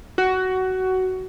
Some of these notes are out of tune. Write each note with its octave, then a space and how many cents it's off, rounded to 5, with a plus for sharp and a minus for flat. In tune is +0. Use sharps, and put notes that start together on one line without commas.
F#4 +15